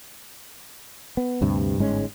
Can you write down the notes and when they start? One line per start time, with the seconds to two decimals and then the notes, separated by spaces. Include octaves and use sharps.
1.17 B3
1.41 D2 G2 C3
1.78 G1 G#2 G#3 C#4